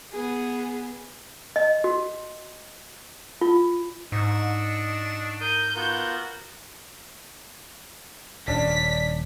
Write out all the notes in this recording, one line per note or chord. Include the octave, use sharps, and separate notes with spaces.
B3 G#4
D#5
F#4
F4
G#2 D4 D#5 C#6 E6
A#4 D#6 G6
B3 F4 F#4 A#4
D#1 C#4 D4 B6